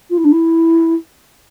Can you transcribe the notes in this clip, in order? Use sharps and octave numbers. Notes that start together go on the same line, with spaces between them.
F4
E4
D4
E4